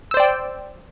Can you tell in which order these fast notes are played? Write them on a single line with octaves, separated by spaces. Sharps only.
E6 C5 D5 G5